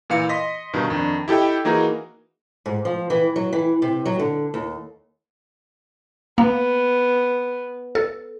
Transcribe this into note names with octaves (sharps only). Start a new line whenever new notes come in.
A#2 E3 F5 C#7
D#5 C6 D#6 A#6 B6
G2 B2 D#3
F2 D#3 D4
E4 G4 A4 D#5 G5
E3 A#3 D#4 F#4 G#4 A#4
G#2
F3
E3
F#3
E3
C3
F#3
D3
D#2
A#3 B3
A4